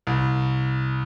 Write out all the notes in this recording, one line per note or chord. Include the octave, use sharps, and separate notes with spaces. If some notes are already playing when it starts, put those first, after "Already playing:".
C2